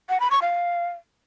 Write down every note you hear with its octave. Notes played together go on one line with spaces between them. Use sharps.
F#5
B5
C#6
F5